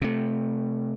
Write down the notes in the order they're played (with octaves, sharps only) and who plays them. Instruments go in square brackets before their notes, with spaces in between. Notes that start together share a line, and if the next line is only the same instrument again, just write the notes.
[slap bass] C3 A3